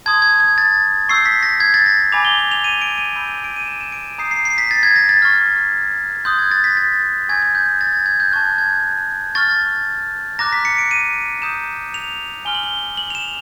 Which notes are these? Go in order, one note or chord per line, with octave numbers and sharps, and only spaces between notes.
A5 C6 D#6 G6 G#6
G#6
G#6
A6
C#6 E6 G6 C7
B6
A#6
G#6
A6
A#6
G#5 B5 D6 F7
G7
G7
F7
D#7
D7
D#7
B5 E6 G6
D7
D#7
E7
E7
D7
A#5 D#6 G6 C7
C7
C7
B6
A6
G#6
A#6
A6
C#6 F6
C6 D#6 F#6 G6
G#6
A6
B6
A6
G#5 C#6 E6 G6 G#6
G#6
G6
A6
G#6
G#6
G6
A5 C#6 F#6 G#6
G#6
C#6 F6 A6
A#5 D6 F#6 A#6
B6
C#7
D7
D#7
A#5 D#6 G6 E7
F7
G#5 C6 F6 G7
F#7
G7
F#7
F7
E7